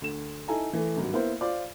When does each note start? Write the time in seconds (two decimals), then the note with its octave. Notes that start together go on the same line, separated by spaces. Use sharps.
0.02 D2 E7
0.48 D#4 E4 A4 G#5 A#5
0.73 E3 A3
0.97 G#1 G2 F#3
1.13 A#3 B3 E4 A#4 C5
1.41 F4 C5 D5 D6